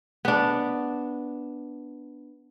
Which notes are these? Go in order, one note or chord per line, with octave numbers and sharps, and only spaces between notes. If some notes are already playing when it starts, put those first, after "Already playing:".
B3 D4